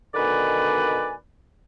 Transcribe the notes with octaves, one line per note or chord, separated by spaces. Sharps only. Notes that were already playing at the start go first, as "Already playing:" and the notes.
B2 D3 D#3 B4 D5 G#5